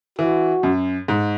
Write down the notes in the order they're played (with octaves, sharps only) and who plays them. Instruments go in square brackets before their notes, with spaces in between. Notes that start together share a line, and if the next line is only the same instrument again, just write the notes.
[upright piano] E3 [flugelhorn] F#4
[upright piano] F#2
G#2